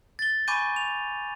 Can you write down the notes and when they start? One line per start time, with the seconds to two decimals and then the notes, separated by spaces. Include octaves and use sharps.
0.19 A6 G7
0.48 G#5 B5 C#6 D6 G6 D#7
0.76 F7